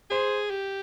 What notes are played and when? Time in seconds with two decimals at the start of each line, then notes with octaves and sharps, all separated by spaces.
0.10 G#4 C5
0.50 G4